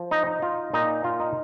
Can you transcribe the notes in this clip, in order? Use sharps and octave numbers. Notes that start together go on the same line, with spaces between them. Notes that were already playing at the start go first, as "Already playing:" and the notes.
Already playing: F3
D#4
D#4
F4
A#2 D#4
F4
D#4